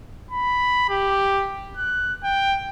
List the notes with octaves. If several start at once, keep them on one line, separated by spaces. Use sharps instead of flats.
B5
G4
F#6
G5